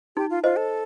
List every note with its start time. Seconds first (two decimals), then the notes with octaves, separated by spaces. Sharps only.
0.16 D#4 G4
0.30 F4
0.44 F4 C5 D#5
0.56 A4